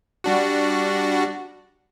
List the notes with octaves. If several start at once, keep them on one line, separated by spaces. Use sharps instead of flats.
G3 D4 F#4